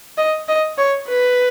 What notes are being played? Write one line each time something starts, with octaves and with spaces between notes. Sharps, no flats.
D#5
D#5
C#5
B4